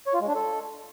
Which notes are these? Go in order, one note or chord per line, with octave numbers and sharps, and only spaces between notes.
C#5
F4
G#3
D4
A4